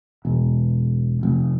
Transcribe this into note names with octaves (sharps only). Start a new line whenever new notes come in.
E1
F1